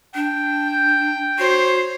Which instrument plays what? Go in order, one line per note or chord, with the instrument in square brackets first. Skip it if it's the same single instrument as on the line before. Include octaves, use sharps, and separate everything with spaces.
[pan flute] D4 [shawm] G5
[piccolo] G6
[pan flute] F#4 [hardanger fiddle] C5 C#5 [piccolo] C7